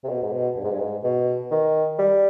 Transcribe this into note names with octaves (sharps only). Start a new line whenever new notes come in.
C3
B2
G#2
B2
G2
G#2
G2
G#2
B2
D#3
G3